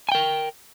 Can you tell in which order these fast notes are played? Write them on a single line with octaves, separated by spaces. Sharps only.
G#5 G5 A#4